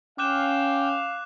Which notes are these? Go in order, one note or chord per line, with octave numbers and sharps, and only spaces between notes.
C#4 F5 G5 D6 F#6 E7